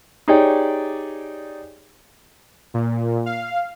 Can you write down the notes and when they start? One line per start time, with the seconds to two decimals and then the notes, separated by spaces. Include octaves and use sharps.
0.28 D#4 G4 G#4 C#5 D5 G5
2.74 A#2
3.26 F5